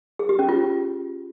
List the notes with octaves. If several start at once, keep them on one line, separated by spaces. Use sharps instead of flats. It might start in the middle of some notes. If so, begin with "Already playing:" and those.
G#4
G4
C#4
F4